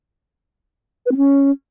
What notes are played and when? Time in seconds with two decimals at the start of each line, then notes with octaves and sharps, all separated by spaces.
1.06 B4
1.11 C4
1.17 C#4